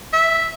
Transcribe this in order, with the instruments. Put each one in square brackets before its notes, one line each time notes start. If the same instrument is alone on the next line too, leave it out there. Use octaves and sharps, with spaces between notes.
[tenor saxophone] E5